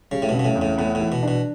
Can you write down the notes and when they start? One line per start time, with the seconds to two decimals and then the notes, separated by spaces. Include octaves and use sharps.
0.11 C#3 G3
0.22 A2
0.29 B2
0.34 C#3
0.39 B2
0.45 A2
0.55 E2
0.61 A2
0.78 A2 B3
0.95 A2
1.00 E3
1.12 B2
1.23 D4
1.28 B2